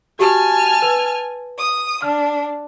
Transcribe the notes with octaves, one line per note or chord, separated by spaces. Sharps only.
F#4 G4 G#5 A5 F6
B4
D#6
D4 F6